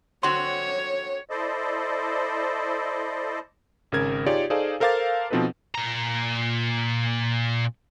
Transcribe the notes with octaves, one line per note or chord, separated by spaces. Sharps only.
D3 C4 F#4 C#5 C6
E4 A4 C5 D5 D#5
G#1 C#3 A#4 G#6
D#4 F4 G4 G#4 C#5 D5
D#4 G#4 A4 C5 D5 F5
A4 A#4 C5 F5 D6 A6
B2 F3 C4 D#4 A4 B4
A#2 A#5